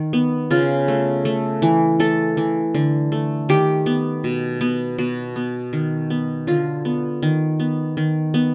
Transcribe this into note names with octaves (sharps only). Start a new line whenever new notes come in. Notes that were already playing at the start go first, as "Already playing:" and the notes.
Already playing: D#3
B3
C#3 F4
A3
A3
E3
A3 A4
E3
D3
A3
D#3 G4
B3
B2
B3
B2 F#4
B3
D#3
B3
D3 F4
B3
D#3
B3
D#3
B3